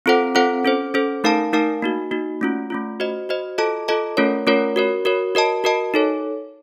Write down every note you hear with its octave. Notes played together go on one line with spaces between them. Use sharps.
C4 F4 A4 C5 F#5
C4 F4 A4 C5 F#5
C#4 A4 C5
C#4 A4 C5
A3 D#4 A#4 F5 A5
A3 D#4 A#4 F5 A5
A#3 D#4 F#4
A#3 D#4 F#4
A3 C#4 F4
A3 C#4 F4
F#4 C5 D#5
F#4 C5 D#5
F4 A4 D#5 A5
F4 A4 D#5 A5
A3 C#4 F4 A#4 C#5
A3 C#4 F4 A#4 C#5
F#4 A#4 C#5
F#4 A#4 C#5
F#4 A#4 D#5 A5
F#4 A#4 D#5 A5
D#4 A4 C#5